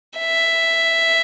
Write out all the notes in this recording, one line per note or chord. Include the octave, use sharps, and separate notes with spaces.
E5